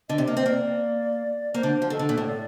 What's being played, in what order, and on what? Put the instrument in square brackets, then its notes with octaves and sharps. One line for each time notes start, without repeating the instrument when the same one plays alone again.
[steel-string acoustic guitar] D3 [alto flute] D#5
[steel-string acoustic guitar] C3 [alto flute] D5
[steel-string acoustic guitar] A#3 [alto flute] D#5
[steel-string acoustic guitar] C4
[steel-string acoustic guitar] A#3 [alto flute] D5
[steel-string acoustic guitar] A#3 [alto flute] C5
[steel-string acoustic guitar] D3
F3
[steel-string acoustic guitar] D#3 [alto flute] A4
[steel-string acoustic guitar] D3
A#2
A2
[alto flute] D5